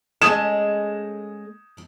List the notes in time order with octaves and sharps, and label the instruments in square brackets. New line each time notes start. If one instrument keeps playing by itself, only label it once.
[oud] G#3 C#4 A4 [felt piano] D#6 G#6 E7